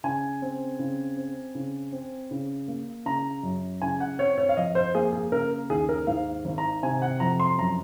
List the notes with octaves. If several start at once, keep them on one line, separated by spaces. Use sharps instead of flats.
C#3 G#5
C4
C#3
C4
C#3
C4
C#3
A#3
C#3 A#5
F#2
C#3 G#5
F#5
C4 C#5
C#5
F5
F2 D#5
C5
A#3 G#4
G#4
C#3 A#4
D#2 G#4
A#4
G#2 F5
G#1
A#5
C3 G#5
F#5
F2 A#5
C6
F#2 A#5